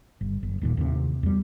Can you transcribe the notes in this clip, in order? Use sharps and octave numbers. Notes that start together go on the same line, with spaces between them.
G1
F#1
D#1 D#2 A#2
D#2 A2 C3
E2 G3